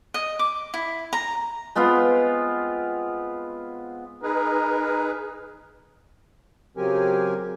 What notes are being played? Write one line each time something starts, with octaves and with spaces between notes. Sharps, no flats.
D#5
D6
E4
A#5
G#3 B3 C4 F4
D#4 G#4 A#4 B4
C#3 F#3 C4 G4 A#4 G#5